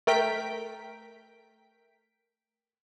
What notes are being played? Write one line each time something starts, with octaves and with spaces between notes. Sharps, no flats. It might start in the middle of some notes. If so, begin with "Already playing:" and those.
A3 A#4 G5 B6 D7